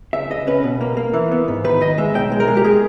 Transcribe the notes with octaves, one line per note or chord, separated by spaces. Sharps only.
C#2 E5
C#2 D#5
C#4 B4
B2
A#3
A#3
E3
B3
G#2
D#3 B4
D#3 D#5
G#3 E5
B1 G5
G#3
A#4
G#3
G4
G#3 G#4